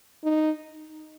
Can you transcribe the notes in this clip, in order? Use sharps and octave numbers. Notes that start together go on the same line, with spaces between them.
D#4